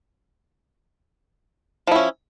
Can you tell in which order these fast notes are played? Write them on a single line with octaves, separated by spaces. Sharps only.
F3 E4 C#4